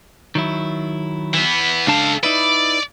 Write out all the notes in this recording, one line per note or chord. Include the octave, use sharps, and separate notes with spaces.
D#3 F#3 E4
E3 B3
C#2 D4 A4 F5 A5
D#4 E4 B4 D5